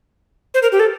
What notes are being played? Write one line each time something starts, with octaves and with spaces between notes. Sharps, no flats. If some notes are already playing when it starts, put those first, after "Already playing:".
C5
A#4
G4
A4